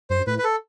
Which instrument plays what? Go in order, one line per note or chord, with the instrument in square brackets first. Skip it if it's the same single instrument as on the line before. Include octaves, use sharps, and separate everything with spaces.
[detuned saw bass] F#2 [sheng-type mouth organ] C5
[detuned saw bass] A2 [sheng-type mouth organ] B4
[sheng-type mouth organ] B4
A4